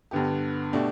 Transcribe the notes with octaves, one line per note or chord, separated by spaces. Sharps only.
G2 D3 B3 G4
B2 A3 D4 G4